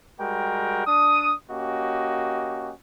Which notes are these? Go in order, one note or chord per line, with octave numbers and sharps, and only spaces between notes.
G3 G#3 F#4 A#4 G5
D4 D#6
A#3 C#4 F#4 G4 D#5